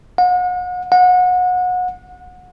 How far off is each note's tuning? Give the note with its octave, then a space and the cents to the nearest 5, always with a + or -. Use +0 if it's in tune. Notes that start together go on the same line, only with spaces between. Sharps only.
F#5 -40
F#5 -30